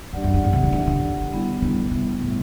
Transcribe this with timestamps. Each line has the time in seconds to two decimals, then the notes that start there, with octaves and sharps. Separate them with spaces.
0.13 G2 D4 G4 D5 F#5
0.24 F#2
0.34 G2
0.44 A2
0.53 C3
0.63 D3
0.73 E3
0.87 D3
1.32 G3 B3 E4
1.62 D3
1.91 C3
2.22 A2